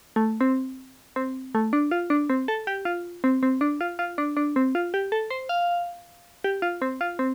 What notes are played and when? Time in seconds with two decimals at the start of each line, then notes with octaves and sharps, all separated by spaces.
0.16 A3
0.41 C4
1.16 C4
1.55 A3
1.73 D4
1.91 F4
2.10 D4
2.30 C4
2.48 A4
2.67 G4
2.85 F4
3.24 C4
3.43 C4
3.61 D4
3.81 F4
3.99 F4
4.18 D4
4.37 D4
4.56 C4
4.75 F4
4.94 G4
5.12 A4
5.30 C5
5.49 F5
6.44 G4
6.62 F4
6.82 C4
7.01 F4
7.19 C4